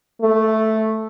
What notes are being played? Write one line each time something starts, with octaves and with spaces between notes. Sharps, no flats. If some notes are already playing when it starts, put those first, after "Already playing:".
A3